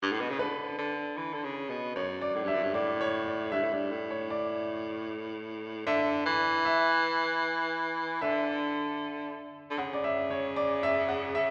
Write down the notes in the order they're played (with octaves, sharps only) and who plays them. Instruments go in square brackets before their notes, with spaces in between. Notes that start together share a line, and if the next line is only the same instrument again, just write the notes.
[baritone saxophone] G2
A2
B2
C#3
[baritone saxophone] D3 [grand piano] B4
[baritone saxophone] D3
E3
D3
C#3
B2
[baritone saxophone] F#2 [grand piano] C#5
[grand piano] D5
[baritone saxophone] A2
[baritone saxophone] G2 [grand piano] E5
[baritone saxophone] F#2
G2
[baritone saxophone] A2 [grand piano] D5
[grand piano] C#5
D5
[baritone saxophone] G2 [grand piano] E5
[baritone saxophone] A2
[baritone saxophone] G2 [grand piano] D5
[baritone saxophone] A2
[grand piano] C#5
D5
[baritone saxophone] D3 [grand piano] E5
[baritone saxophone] E3
[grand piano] E5
[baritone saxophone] D3 [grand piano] E5
[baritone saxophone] D3
[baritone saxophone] C#3 [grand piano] F#5
[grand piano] D5
E5
C#5
D5
E5
F#5
E5